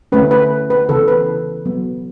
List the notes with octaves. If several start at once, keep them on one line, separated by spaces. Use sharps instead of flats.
D3 A3 C#4 B4
B4
B4
C#3 E3 B3 A4
B4
F#3 B3